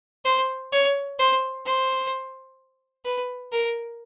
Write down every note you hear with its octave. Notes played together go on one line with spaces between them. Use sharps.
C5
C#5
C5
C5
B4
A#4